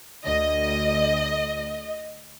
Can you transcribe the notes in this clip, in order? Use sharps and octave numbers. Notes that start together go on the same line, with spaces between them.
D2 D#5